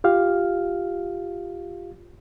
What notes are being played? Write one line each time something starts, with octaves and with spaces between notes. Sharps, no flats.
F4 G4 F5